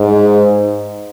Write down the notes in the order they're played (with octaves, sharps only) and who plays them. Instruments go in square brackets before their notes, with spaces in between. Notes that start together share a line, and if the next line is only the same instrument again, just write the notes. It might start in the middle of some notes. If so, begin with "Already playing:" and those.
Already playing: [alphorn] G#2